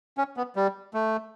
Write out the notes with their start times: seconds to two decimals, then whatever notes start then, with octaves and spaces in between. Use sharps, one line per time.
0.18 C#4
0.37 B3
0.56 G3
0.94 A3